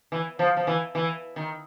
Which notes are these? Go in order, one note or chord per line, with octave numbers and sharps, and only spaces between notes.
E3
F3
F3
E3
E3
D#3